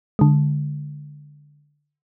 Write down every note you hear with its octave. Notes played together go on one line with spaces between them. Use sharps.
D3 G#3